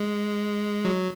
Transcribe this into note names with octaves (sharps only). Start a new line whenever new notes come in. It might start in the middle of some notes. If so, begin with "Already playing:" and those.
Already playing: G#3
F#3